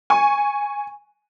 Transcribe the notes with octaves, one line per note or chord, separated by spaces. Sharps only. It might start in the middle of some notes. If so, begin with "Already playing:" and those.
G#5 C#6